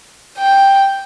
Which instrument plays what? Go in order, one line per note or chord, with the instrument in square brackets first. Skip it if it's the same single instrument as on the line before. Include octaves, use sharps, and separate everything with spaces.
[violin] G5